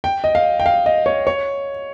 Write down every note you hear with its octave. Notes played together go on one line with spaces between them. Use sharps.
G5
D#5
F5
G5
F5
D#5
C#5
C#5